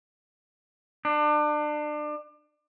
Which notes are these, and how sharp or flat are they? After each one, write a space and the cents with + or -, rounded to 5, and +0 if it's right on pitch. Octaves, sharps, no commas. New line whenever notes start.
D4 +30